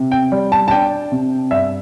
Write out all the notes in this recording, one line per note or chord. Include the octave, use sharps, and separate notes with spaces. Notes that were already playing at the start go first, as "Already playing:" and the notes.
Already playing: C3
G5
G3
A5
A5
D4 G5
C3
G2 E5